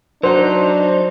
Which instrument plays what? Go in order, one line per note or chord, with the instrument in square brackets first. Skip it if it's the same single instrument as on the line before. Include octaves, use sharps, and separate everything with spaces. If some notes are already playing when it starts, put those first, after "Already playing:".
[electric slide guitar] F#3 D#4 [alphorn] D4 [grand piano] F#4 A#5 [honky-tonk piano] C5